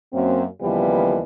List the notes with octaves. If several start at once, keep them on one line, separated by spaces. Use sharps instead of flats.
F#2 A#3 C4
D#2 C#3 E3 F3 G3 B3